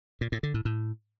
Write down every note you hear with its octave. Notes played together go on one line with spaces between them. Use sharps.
A#2
A2
D3
A2
A2